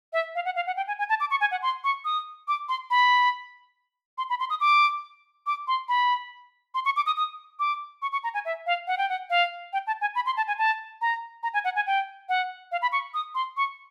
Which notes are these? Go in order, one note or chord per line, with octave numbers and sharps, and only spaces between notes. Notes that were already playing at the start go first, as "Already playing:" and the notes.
E5
F5
F#5
F5
F#5
G5
G#5
G#5
A5
D6
C#6
G#5
F#5
C6
C#6
D#6
D6
C6
B5
C6
B5
C6
D#6
D6
D6
C6
B5
C6
C#6
D6
D#6
D#6
D6
C#6
C#6
A#5
G#5
E5
F5
F#5
G5
F#5
F5
G5
A5
G#5
B5
C6
A5
G#5
A5
A#5
A#5
G#5
F#5
G#5
G5
F#5
F5
B5
C#6
D#6
C6
C#6